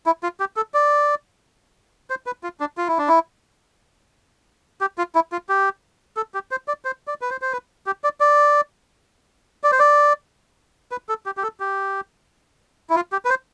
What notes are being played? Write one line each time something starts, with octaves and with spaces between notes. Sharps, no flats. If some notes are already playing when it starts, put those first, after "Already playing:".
E4
F4
G4
A4
D5
C5
B4
F4
D4
F4
E4
D4
E4
G4
F4
E4
F4
G4
A4
G4
C5
D5
C5
D5
B4
C5
C5
B4
G4
D5
D5
D5
C5
D5
B4
A4
G4
G4
A4
G4
E4
F4
G4
B4
C5